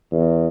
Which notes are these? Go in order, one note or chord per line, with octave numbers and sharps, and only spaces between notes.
E2